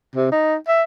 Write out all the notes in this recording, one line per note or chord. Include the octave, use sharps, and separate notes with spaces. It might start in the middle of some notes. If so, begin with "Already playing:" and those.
C3
D#4
E5